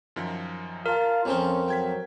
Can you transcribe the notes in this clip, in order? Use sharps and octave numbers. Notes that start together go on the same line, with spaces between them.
F#2 D#3 F3
F4 A#4 F5 A5
F2 F3 C4 C#4
F#3 G5 G#6 B6